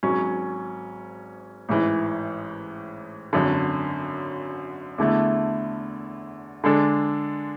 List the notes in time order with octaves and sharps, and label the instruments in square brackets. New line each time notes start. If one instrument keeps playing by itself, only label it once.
[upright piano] G#1 G#2 F#3 C#4
A1 G#2 E3
G#1 F#2 D3
E2 D3 A3 E4
D3 G#3 D4 A4